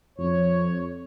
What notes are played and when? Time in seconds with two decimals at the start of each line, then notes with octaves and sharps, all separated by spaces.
0.18 F2 C#5